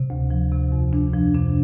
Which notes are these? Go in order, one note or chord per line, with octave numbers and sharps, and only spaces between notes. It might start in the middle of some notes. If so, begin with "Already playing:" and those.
Already playing: C3
D2
F3
C3
F2
F2 D4
F3
C3 D4